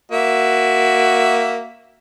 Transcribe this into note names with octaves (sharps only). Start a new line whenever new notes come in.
A#3 F#4 E5